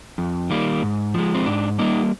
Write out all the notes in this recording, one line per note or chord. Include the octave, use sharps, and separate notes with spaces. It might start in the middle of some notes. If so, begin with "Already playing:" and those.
F2
D#3 G3 A#3
G#2
F3 G#3
C4
G#2 D4
G3 A#3 D#4